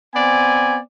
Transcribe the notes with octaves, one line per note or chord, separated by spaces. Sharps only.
B3 C4 D5 G#5